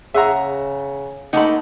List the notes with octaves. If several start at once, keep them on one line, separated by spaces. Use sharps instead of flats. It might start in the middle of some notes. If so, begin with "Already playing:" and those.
C#3 G#4 E5 F#5 A#5
A3 A#3 D#4 F#5 B5